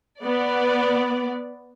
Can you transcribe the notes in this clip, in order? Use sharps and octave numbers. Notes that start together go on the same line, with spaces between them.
B3 D5